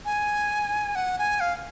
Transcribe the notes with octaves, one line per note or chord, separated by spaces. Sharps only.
G#5
F#5
G#5
F5